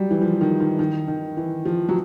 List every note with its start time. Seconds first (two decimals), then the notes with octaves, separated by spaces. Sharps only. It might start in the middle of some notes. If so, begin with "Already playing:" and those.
Already playing: F#3 G3
0.11 E3
0.21 F3
0.41 D#3
0.60 D#3
0.79 D#3
1.08 D#3
1.37 E3
1.65 F3
1.89 F#3